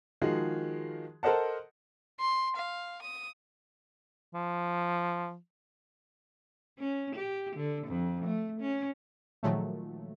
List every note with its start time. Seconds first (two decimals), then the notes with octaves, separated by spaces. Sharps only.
0.22 D#3 F3 G#3 F#4 G#4
1.23 A4 A#4 C5 D#5 F#5 A5
2.20 C6
2.56 F5
3.02 D#6
4.34 F3
6.79 C#4
7.15 G4
7.56 D3
7.87 F2
8.25 A3
8.61 C#4
9.43 A#2 D#3 F3 F#3 G#3 A3